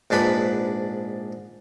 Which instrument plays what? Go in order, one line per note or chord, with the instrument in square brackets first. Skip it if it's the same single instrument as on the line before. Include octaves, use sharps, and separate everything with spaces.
[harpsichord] A#1 G#2 D4 B4 B5